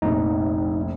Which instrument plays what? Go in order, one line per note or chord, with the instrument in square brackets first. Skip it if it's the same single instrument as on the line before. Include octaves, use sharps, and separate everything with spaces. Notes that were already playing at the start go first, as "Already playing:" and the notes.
[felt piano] F1 A#1 [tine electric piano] D#4